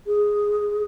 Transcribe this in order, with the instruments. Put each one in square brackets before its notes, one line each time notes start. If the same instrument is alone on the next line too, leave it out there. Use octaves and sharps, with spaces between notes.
[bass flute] G#4